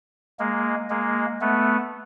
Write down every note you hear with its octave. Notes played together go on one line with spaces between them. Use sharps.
G#3 A#3
G#3 A#3
A3 B3